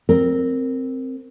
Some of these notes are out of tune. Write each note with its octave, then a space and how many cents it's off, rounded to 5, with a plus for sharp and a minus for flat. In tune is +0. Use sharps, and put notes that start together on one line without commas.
C4 +0 A#4 -10